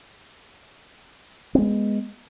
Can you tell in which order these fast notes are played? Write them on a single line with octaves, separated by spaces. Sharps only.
C4 G#3 B3